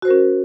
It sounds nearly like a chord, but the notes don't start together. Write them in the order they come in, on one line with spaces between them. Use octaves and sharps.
F#4 C5 A#4 C#4